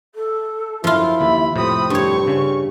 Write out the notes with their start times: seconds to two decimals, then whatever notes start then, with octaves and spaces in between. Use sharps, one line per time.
0.15 A4
0.84 F#2 F3 E4 F4
1.21 D#2 B5
1.56 F2 A2 C3 C4 B5 D#6
1.90 G2 C#5 C#6
2.27 C#3 C#4